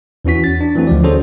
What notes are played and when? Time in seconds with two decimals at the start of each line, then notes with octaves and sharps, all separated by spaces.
0.25 E2 E3 C#4 F#4 B6
0.44 A6
0.61 D4
0.75 E3 F#3 A3 C4 F#4
0.87 D2 F3 D5
1.04 C#4 F#4 G#4 A4 C5 C#5